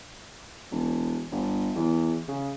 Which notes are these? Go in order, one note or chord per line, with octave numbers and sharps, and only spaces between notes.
E1
G1
E2
C#3